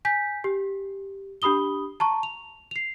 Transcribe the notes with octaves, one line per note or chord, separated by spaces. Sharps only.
G#5 G6 B6
G4
D4 G4 B5 D#6 G7
A5 A#5 C#6
F7
C7 F7